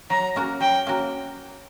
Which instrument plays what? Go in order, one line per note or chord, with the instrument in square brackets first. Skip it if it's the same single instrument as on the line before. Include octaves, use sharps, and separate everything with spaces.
[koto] F#3 [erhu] A#5
[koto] A#3 C#4 F#4 A#4
[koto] F#3 [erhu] G5
[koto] A#3 C#4 F#4 A#4